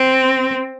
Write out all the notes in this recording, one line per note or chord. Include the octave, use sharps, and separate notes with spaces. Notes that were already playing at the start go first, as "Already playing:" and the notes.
Already playing: C4